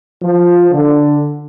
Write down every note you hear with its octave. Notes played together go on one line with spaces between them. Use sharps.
F3
D3